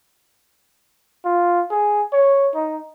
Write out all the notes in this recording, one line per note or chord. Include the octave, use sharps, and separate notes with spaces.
F4
G#4
C#5
D#4